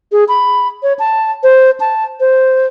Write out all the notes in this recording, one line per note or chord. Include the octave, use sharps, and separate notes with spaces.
G#4
B5
C#5
A5
C5
A5
C5